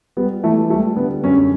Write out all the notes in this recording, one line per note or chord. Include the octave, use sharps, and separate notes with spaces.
G3 B3
E3 A3
G3 A3
D3 B3
F#2 C#4